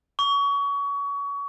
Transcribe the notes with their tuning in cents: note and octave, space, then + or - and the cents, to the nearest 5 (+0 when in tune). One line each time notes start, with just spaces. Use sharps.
C#6 +30